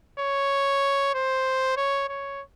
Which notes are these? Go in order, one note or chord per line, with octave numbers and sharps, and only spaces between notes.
C#5
C5
C#5
C#5